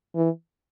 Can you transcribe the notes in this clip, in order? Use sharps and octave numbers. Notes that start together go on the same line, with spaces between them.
E3